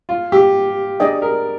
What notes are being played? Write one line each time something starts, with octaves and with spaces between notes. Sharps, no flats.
F4
G4
D4 G#4 D5 D#5 G5
A#4